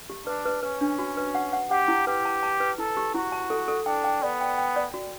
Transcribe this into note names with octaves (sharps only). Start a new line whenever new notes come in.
G4
D4 B4
B4
C#4 B4
D4
F#4
B4
F#5
F#5
G4 F#5
E4
G4 B4
A5
A5
B4
E4 A4
G4
E4 F#4
A5
A4
A4
D4 G5
G5
B3 D5
G5
G5
D5
F#4